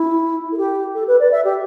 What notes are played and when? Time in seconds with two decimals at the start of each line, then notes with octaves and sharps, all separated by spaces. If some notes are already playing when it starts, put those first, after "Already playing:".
Already playing: E4
0.52 A4
0.57 G4
0.95 A4
1.08 B4
1.20 D5
1.32 E5
1.45 G4